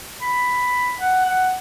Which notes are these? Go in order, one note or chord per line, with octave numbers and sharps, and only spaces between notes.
B5
F#5
F#5